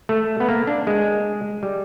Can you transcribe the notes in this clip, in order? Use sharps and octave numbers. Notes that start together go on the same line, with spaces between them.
A3
B3
A#3
D4
G#3
G3